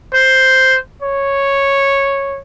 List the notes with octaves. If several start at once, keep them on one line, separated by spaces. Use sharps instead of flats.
C5
C#5